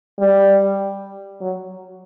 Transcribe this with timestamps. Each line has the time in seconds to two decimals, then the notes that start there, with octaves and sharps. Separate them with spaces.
0.19 G3
1.41 F#3